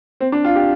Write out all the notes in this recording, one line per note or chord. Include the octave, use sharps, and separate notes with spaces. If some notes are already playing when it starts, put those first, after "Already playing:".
C4
D4
F4
G4